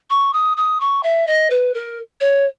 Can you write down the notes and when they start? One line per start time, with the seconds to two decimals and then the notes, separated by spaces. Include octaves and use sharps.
0.10 C#6
0.33 D#6
0.57 D#6
0.80 C#6
1.03 E5
1.27 D#5
1.50 B4
1.74 A#4
2.21 C#5